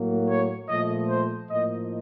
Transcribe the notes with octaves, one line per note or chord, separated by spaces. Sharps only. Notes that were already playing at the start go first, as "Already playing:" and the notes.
Already playing: A2 F#3 A#3
C#5
A#2 F3 A3 D#5
C5
A2 F3 A#3 D#5